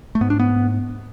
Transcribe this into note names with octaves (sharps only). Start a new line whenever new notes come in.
A3
G#2 B3
D4
B3